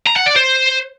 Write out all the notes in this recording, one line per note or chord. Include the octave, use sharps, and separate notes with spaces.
A#5
F#5
D5
C5